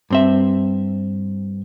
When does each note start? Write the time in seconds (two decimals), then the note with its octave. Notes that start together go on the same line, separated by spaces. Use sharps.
0.10 G2 C4 E5